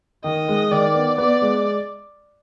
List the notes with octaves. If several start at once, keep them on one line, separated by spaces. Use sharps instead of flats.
D#3 D#5
G#3
D#3 D5
B3
B3 D5
G#3